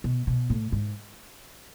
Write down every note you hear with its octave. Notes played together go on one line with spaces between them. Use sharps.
B2
B2
A2
G#2